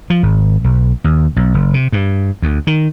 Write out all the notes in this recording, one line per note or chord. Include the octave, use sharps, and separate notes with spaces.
F3
G#1
B1
D#2
B1
F#1
C3
G2
D2
D#3